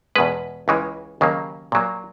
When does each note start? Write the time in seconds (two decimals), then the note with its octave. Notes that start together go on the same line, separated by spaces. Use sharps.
0.16 E2 B2 G#3 B4
0.68 C#2 C#3 E3 G#3
1.21 D#2 C#3 F#3 A#3
1.72 A#2 F#3 A#3